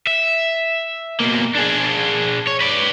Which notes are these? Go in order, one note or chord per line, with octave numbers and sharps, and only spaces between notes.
E5
B2 A#3
D4 G#4
C#5
B4 D5